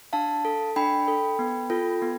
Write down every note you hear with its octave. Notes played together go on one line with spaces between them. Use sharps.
D4 F5 A5
A4
D4 G5 B5
A4
B3
F4 A4
B3